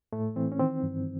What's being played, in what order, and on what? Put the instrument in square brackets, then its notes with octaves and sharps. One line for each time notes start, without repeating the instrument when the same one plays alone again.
[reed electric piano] A2 A3
E3 C4
C#4
D#3 C4
G2